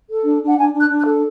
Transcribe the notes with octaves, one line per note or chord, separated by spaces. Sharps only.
A4
D4
D4
F#5
D4 G#5
D4
F#6
D4
F#6
A4